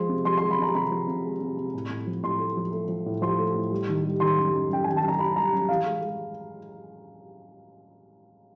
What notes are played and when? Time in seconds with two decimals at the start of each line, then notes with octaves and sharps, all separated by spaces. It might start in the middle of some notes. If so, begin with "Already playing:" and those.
Already playing: F3 G#3 C6
0.09 C3
0.25 F3 C6
0.38 G#3 C6
0.51 B5
0.59 C3 A#5
0.75 C3 B5
0.91 F3
1.07 C3
1.25 G#3
1.40 C3
1.57 C3
1.74 A2
1.90 A2
2.07 F3
2.23 A2 C6
2.39 A3
2.57 F3
2.72 A3
2.88 F3
3.06 A2
3.21 F3 C6
3.38 A3
3.55 A2
3.71 G3
3.88 D#3
4.04 G3
4.20 D#3 C6
4.38 F#2
4.54 F#2
4.70 F#2 G5
4.84 D#3 G#5
4.96 A5
5.03 F#2
5.08 A#5
5.19 F#2 B5
5.36 G3 A#5
5.52 F#2
5.69 E3 F5
5.86 G#3
6.01 G#3